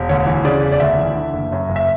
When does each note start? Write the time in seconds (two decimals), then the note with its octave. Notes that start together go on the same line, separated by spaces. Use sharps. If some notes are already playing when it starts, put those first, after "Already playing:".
Already playing: E1
0.09 D2 C#5
0.27 E3
0.45 C#3 D5
0.63 E1
0.72 D5
0.80 D2 E5
0.98 E3
1.16 D3
1.33 F#1
1.52 F#2
1.69 F#1
1.76 E5